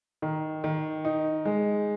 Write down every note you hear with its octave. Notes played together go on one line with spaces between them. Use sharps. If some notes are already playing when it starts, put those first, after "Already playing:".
D#3
D#3
D#4
G#3